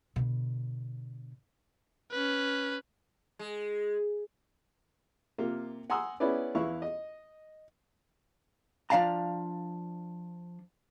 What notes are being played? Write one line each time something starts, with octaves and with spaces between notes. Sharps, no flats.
B2 D3
C#4 B4
G#3
C3 A#3 F4
F#5 G#5 A#5 C6 D#6 E6
B3 C#4 E4 G#4 B4 D5
E2 E4 B4 F5 C#6
D#5
F3 D4 D5 F5 A5 A#5